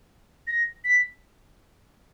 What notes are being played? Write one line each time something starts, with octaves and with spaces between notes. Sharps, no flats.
A#6
B6